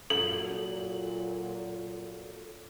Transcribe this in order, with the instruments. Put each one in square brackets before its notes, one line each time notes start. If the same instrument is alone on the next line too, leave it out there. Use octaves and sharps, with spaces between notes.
[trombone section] A#2 F#3 [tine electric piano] A4 [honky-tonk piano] F#7